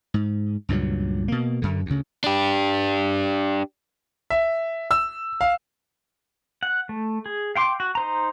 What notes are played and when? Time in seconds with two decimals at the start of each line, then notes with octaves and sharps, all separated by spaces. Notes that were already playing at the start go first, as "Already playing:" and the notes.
0.14 G#2
0.69 C#2 G2 A#2 F#3
1.28 B2 A#3
1.62 F#2 D3
1.86 D2 C#3
2.24 D4 G4
4.30 E5
4.91 E6
5.41 F5
6.63 F#5
6.89 A3
7.26 G#4
7.56 F5 G5 C6 D6
7.80 F#4
7.95 D#4 C5 A#5